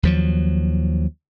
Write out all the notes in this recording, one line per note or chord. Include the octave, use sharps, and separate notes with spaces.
D#2 F3 F#3